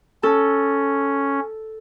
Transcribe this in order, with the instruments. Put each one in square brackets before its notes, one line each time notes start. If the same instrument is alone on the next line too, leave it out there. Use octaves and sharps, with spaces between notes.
[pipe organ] C#4 [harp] A4